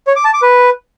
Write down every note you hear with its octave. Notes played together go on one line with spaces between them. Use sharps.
C#5
D6
A5
D6
B4